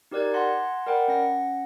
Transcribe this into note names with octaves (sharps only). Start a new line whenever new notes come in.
D#4 G4 A#4 D5 F#6 G#6
F#5 A5 C6 F#6 G#6 A#6
A#4 D5 F#5 G5 B5
C#4 F#5 A#6